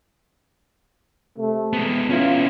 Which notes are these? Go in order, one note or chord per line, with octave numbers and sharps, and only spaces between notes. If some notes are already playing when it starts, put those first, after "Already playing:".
C3 A3
G#3 B3
B3 C#4 E4 F4